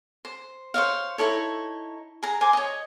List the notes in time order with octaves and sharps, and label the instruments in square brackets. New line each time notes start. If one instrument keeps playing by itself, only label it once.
[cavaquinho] C5
C5 C#5 E5 F5
D#4 E4 A4 C#5
G#4 A#5
C5 G#5 D6
C#5 D#5